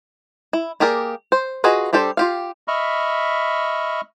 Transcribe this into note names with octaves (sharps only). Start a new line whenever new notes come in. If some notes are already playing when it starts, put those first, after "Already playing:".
E4
A#3 G4 G#4 A#4 D5
C5
F4 F#4 G#4 B4 D#5
G3 D4 G4 A4 C5
F4 G4 F5
D#5 E5 B5 C#6 F6